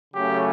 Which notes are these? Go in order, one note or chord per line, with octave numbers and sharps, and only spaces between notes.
C#3 F#3 A3 C#4 G4